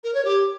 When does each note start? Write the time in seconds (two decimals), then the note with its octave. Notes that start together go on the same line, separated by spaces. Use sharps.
0.04 A#4
0.14 C#5
0.25 G4